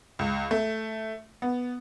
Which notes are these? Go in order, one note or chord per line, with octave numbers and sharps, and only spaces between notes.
C#2
A3
B3